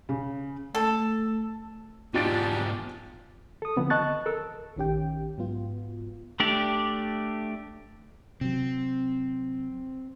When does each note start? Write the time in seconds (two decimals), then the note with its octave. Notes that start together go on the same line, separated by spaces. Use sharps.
0.09 C#3
0.75 A3 A4
2.14 G#2 B2 D4 F4 G4 A6 D7
3.62 A4 D#6
3.76 D3 F3 B3 C4
3.90 D#5 A5 C#6 F#6 A6
4.26 A4 A#4 E6
4.76 A#1 D#3 C#4 G4 G5
5.38 G#2 F#3 B3 F4
6.40 A3 D4 G4 D5
8.41 C3 F#3 C4